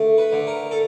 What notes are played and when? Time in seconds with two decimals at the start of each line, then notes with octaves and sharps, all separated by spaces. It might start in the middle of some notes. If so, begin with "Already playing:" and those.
Already playing: D3 A3
0.18 B4
0.33 D3
0.47 A#4
0.71 A4